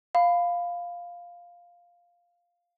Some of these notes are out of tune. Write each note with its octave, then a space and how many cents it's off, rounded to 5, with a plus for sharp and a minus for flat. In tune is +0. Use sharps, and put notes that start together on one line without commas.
F5 +0 B5 +15